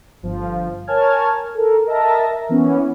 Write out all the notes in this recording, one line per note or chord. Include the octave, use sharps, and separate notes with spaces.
G1 F3 F4
A#4 C#5 G#5 A5 F6 G#6
A4 A#4
A#4 D#5 E5 A5 A#6
A#4
E3 B3 C#4